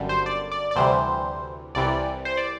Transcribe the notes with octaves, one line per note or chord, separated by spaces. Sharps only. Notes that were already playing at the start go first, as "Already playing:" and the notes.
Already playing: G1 F#2 D3 G3
C5
D5
D5
D5
D2 C3 E3 G3 C5
C2 C3 E3 G3 D5
C5
D5